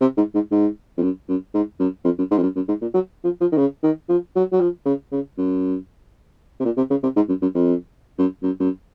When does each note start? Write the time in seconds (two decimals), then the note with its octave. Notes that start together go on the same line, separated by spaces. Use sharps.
0.01 C3
0.17 G#2
0.34 G#2
0.51 G#2
0.98 F2
1.02 F#2
1.28 F#2
1.54 G#2
1.79 F#2
2.04 F2
2.18 F#2
2.31 G#2
2.38 F2
2.43 F#2
2.56 F#2
2.68 G#2
2.81 A#2
2.94 F#3
3.24 F3
3.41 F3
3.52 D#3
3.58 C#3
3.83 D#3
4.09 F3
4.35 F#3
4.52 F#3
4.61 F3
4.85 C#3
5.12 C#3
5.38 F#2
6.60 C3
6.65 A#2
6.77 C3
6.90 C#3
7.03 C3
7.16 G#2
7.29 F#2
7.42 F#2
7.55 F2
8.18 F#2
8.43 F#2
8.60 F#2